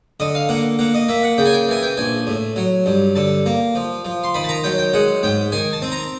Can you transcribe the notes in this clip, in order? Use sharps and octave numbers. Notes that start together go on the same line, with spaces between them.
D3 D#5
F5
A#3 F#5
A#3 F#5
D#5
A#3 E5
F#5
C#3 G5
G#5
G5
E3 G#5
G5
A#1 G#5
A2
F#3
G2
D3 A5
A#3
F3
F3
C6
D#3 B5
A5
A#5
F#3 G5
G5
G#3 F#5
G#2 G5
D#3 G#5
A5
C4
A#5